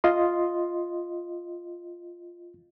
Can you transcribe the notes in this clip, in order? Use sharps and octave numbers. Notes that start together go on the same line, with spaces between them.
F4 D#5 C6